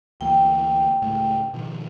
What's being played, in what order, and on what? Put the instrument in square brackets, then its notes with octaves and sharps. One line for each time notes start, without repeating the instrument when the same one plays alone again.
[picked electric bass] D2 E3 A#3 [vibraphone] G5
[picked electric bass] C#2 A2 A3
B2 D#3 F3